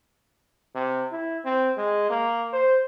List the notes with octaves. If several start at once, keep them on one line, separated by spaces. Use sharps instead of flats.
C3
E4
C4
G#3
A#3
C5